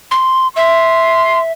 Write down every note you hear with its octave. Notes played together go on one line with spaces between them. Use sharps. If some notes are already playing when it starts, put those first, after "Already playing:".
C6
E5 C6